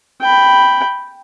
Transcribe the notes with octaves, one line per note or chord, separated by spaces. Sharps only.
G5 B5